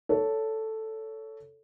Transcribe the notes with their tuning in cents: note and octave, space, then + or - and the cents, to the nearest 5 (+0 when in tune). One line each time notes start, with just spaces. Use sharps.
A4 +0 C#5 +20